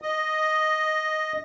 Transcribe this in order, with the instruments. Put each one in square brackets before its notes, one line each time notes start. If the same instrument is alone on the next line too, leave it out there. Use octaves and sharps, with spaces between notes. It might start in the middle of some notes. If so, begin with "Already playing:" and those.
[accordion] D#5